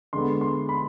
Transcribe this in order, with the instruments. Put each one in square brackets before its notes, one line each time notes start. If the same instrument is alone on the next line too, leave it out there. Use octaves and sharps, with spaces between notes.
[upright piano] D3 G#3 B3 C6
C6
B5